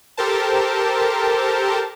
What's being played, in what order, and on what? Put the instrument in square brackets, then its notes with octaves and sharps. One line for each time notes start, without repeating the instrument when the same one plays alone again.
[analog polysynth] G4 A4 A#4 C5 A5